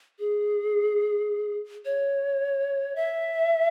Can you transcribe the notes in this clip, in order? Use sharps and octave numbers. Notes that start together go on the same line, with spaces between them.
G#4
C#5
E5